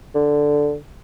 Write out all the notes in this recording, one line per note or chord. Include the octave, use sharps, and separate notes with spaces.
D3